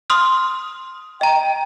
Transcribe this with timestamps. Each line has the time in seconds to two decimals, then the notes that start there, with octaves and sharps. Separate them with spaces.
0.10 C6 D#6 F6
1.21 D#5 G5 A#5